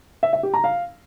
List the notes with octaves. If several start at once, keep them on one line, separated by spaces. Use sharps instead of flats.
E5
E5
G4
A#5
F5